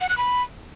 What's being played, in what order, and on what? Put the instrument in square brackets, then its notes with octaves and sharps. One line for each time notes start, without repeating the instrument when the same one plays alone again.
[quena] F#5
F#6
B5